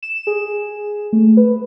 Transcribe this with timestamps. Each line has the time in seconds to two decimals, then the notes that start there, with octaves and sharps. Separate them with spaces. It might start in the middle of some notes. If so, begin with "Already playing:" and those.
0.03 E7
0.27 G#4
1.13 A3
1.37 B4